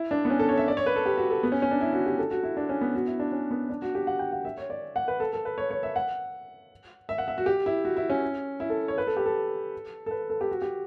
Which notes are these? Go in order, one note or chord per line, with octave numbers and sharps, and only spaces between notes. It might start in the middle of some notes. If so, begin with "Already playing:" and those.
Already playing: E4
D4
B3
C#4
A4
C#5
E5
D5
C#5
B4
A4
G4
F#4
A4
B3
C#4
C#4
D4
E4
F#4
G4
A4
F#4
E4
D4
C#4
B3
F#4
E4
D4
C#4
B3
D4
F#4
G4
F#5
G5
F#5
E5
C#5
D5
F#5
B4
A4
A4
B4
C#5
C#5
E5
F#5
E5
F#5
E5
F#4
G4
E4
F#4
E4
C#4
E4
A4
C#5
B4
A4
G4
A4
A4
B4
A4
G4
F#4
G4